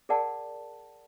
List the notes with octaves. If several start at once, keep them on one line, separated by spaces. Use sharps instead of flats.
G#4 A#4 D5 F#5 A5